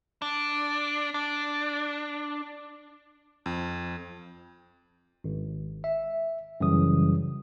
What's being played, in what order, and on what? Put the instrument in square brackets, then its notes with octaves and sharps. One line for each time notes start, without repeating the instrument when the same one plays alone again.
[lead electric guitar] D4
D4
[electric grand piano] F2
[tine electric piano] G#1
E5
F#2 C#3 E3 G3 D#6